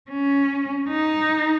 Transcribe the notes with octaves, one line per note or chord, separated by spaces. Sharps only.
C#4
D#4